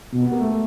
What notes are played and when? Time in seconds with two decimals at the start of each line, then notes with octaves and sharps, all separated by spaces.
0.13 B2
0.22 B3
0.31 A#3
0.40 A3